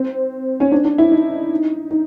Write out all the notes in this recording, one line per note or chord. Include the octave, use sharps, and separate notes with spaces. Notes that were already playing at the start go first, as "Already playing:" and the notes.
Already playing: C4
C#4
D4
D4
E4
D#4
D#4